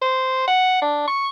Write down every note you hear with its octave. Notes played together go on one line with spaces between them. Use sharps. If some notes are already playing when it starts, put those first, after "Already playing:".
C5
F#5
D4
C#6